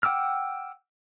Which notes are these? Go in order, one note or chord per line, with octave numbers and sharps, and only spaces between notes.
F#5 G5 D6 E6 F6